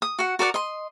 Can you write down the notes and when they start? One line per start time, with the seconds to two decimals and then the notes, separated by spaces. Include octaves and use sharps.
0.02 D#6
0.19 F#4 F#5
0.39 F#4 A#4 D5 F#5
0.54 D#5 C6